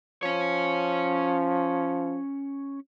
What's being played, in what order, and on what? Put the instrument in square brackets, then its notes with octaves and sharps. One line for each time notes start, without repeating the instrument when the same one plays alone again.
[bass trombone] F3 [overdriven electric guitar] C#4 C#5